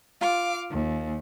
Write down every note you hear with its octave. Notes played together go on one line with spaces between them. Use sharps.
F4 F5 D6
D#2